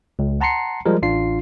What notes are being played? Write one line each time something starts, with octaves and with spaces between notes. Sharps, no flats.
C#2
F#5 A5 A#5 C6 C7 C#7
F3 G3 G#3 A#4
A1 D4 F4 C7